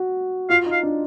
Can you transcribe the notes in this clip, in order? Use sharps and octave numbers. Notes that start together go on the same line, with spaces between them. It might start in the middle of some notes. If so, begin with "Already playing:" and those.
Already playing: F#4
F4 F5
D#4
F5
D4